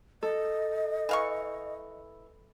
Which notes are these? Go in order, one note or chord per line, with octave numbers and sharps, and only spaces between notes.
A4 D#5
E3 F5 C#6